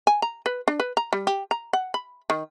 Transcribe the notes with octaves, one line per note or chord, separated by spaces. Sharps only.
G#5
A#5
B4
D4
B4
A#5
G3
G4
A#5
F#5
B5
D#3